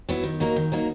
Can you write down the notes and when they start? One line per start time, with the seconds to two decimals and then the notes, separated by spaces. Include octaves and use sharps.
0.09 F#3 B3 E4
0.24 D#3
0.40 F#3 A#3 D#4 A#4
0.56 D#3
0.72 F#3 A#3 D#4 A#4